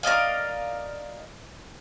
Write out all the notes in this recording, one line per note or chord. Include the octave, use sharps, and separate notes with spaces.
A#4 D5 D#5 F5